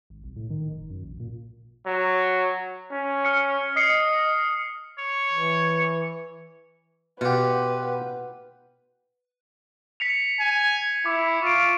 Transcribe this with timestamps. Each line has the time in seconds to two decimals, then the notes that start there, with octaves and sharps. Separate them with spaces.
0.10 G#1
0.24 C2
0.36 A2
0.50 D#3
0.71 F#1
0.90 F#2
1.04 A#1
1.20 A#2
1.86 F#3
2.91 C#4
3.25 F6 C#7
3.76 D#5 D#6 C7 C#7
4.99 C#5
5.33 E3
7.21 B2 F4 G4 B4 F#5
10.00 B6 C#7 F7
10.40 G#5
11.06 E4 D6
11.42 F4 C#6 D7